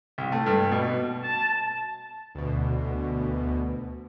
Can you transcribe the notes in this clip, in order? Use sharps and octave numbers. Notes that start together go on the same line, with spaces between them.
C2
A3
G2
B2
A5
D2 B2